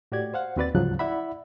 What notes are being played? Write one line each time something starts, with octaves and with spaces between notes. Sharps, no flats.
A2 F#4 G4 D5 G#6
C5 F5 F#5
D#2 C4 F#4 B4 D5 A6
D2 G#2 C#3 F3 F#3 F#6
E4 D5 E5 F#5 B5